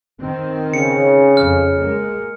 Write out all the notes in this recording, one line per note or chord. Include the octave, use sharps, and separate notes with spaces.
D#3 C4
C#3 C#7
F2 F6
G#3 A#3